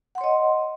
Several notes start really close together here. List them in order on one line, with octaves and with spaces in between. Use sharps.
F#5 C6 C#5 D#5